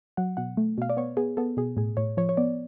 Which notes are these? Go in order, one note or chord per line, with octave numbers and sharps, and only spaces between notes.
F#3 F#5
B2 F#5
A3
B2 F5
D5
B3 C#5
B3 G#4
B3 A4
B2 G#4
A2 G#4
A2 C#5
F3 C#5
C#5
B3 D5